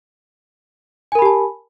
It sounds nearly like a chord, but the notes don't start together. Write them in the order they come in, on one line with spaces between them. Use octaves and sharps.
G#5 A#4 B5 G4 A5